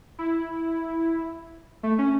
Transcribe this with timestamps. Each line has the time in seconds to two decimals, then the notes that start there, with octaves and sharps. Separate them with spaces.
0.19 E4
1.83 A3
1.98 C#4